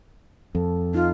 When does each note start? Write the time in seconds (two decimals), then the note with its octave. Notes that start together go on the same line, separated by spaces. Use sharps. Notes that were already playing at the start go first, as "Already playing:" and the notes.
0.55 F2 A4
0.94 D#4 F4